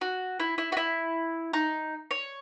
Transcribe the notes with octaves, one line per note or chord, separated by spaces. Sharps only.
F#4
E4
E4
F#4
E4
D#4
C#5